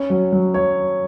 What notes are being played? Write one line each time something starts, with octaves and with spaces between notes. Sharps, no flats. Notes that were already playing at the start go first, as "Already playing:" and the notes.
Already playing: C#4
F#3
F#3
C#5